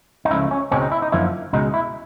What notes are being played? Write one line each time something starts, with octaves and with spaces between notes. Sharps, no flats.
D#4
C#2 C#3 F3 A3 E4
C#4
C#2 B2 G#3 C4 C#4
D#4
E4
D#4
F#2 D3 F3 A#3 E4
C#2 B2 G#3 D#4
E4